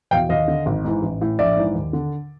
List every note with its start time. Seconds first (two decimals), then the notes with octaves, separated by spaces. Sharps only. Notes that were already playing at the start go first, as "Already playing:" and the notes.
0.11 E2 B2 F5 G5
0.29 D#2 D#5 F5
0.48 D3
0.66 G#1
0.84 G#2 E3
1.02 A1
1.21 A2 E3
1.39 A#1 D5 E5
1.57 G#2 E3
1.75 D#2
1.93 D3